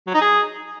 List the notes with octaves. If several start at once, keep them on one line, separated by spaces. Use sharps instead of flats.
F#3
D#4
G#4